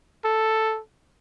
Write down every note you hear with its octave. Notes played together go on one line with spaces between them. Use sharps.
A4